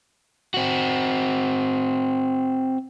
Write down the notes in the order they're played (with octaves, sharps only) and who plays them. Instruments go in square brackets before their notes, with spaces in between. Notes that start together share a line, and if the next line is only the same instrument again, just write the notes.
[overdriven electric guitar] C4 F#4